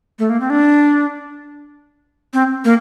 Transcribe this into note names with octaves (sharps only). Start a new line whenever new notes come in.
A3
A#3
C4
D4
C4
A#3